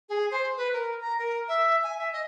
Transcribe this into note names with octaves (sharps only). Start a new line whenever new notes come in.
G#4
C5
B4
A#4
A#5
A#4
E5
G#5
E5
D#5